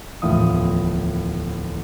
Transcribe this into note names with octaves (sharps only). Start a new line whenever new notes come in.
D1 E2 A2 F3 F5 D#6